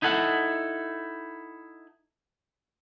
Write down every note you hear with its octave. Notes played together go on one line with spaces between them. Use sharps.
D#4 E4 A4 F#5